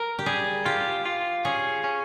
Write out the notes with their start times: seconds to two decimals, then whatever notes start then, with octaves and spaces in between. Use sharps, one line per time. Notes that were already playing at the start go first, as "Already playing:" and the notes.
Already playing: A#4
0.19 G4
0.26 G3 G#4
0.65 F4 G4
1.06 F4
1.45 C#4 G#4
1.84 C#4